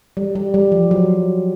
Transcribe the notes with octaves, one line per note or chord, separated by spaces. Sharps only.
G3
G3
G3
F3
F#3